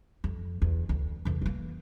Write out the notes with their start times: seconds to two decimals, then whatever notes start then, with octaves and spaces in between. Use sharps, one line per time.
0.24 F2
0.62 E2
0.89 D2
1.25 E2 D3
1.42 E3 A#3